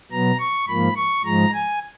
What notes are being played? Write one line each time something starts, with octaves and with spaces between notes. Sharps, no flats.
B2 F#3 B3 A#5
C#6
G#2 F3 A#3 B5
C#6
G#2 F3 G#3 A#5
G#5